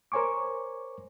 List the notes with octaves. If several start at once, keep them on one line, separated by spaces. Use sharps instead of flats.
A#4 C5 C#5 G#5 C#6 D6